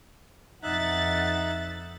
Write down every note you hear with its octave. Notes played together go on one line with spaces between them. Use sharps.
F2 D#4 E5 F#5 F#6 A6